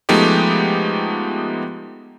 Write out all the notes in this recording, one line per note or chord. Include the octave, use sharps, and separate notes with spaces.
F3 G#3 A3 B3 D#4 G4